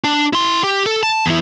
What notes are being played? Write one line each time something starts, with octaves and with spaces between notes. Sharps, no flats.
D4
E4 C6
G4
A4
A5
E2 E4